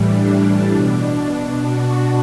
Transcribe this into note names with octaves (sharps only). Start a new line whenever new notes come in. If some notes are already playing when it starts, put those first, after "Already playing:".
Already playing: A2 E3 G3
D4
B2 D4
F#4